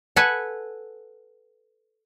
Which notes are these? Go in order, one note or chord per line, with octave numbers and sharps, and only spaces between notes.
A4 B4 F#5 G#5